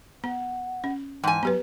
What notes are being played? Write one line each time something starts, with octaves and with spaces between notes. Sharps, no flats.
B3 F#5
C#4
G#2 E3 G5 G#5
F#3 B3 G4 B4